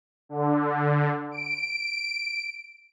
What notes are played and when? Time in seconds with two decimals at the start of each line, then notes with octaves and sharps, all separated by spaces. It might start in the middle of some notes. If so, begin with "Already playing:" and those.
0.29 D3
1.31 D7